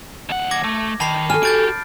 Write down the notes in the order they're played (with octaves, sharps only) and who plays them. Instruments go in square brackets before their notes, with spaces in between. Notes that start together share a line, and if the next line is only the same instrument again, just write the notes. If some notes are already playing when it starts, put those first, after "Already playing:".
[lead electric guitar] D#2 F#5
[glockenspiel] D6 G#6 A#6
[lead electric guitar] A3
[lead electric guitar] D#3 [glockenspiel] A5 B5 C7
[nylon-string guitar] A4 G#5 [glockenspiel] F6
[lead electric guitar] F#4 G4 [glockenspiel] G6 A6 D7